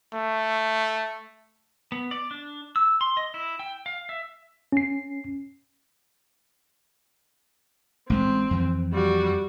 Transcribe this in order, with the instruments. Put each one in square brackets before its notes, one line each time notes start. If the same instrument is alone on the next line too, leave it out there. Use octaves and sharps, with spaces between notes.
[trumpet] A3
[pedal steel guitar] B3
D5
D4
E6
C6
D#5
E4
G5
F5
E5
[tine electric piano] C#4 C7
[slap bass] A1 G#3 A3 [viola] C4
[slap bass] F2 E3
[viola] G3 F#4